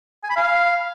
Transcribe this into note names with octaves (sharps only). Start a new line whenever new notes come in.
G#5
B5
F5